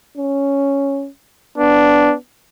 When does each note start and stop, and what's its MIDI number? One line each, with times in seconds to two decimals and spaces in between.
0.17 1.08 61
1.58 2.15 59
1.58 2.15 62